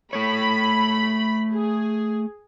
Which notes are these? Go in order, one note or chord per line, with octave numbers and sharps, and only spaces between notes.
A3 C#5 B5
G#4